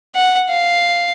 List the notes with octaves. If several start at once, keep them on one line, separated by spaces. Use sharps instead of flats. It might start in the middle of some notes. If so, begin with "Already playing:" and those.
F#5
F5